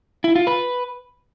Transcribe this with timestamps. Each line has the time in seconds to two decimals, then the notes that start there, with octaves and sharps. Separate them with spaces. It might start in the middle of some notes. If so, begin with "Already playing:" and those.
0.24 E4
0.36 F4
0.47 B4